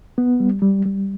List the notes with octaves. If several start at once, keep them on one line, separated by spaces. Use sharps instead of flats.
B3
G3
G3
G3